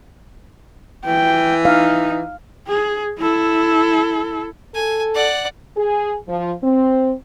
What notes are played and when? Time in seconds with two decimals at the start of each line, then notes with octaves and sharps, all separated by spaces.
1.06 E3 G5
1.65 D#4 F5
2.67 G#4
3.19 E4 A4
4.75 A4 G#5
5.15 D5 F#5
5.77 G#4
6.29 F3
6.63 C4